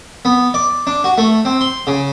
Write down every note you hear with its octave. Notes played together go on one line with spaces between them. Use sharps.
B3
D5
D4
F#4
A3
C4
C6
C#3